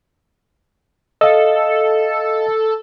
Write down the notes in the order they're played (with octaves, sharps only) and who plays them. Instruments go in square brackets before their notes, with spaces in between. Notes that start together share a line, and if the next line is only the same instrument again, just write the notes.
[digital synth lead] A4 [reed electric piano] D#5 F5